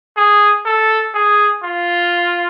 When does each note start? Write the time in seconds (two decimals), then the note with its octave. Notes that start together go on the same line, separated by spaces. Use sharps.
0.17 G#4
0.65 A4
1.14 G#4
1.64 F4